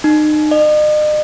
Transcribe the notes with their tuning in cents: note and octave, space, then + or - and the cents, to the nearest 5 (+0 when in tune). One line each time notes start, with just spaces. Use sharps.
D#4 -35
D#5 -40